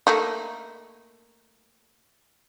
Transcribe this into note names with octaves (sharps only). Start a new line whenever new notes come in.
A3 A#3 D#4